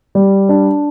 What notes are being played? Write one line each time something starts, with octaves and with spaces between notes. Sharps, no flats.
G3
D4